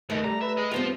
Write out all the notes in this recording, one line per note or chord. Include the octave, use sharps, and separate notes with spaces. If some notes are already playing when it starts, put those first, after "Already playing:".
D#2 B2 D#3 A3
G3 A#5
B4 E5
G#4 D#5
G2 G3 B3 C4 F4 C5